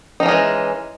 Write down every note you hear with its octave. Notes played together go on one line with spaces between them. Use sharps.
E3 F3 G#3 C#4 D#4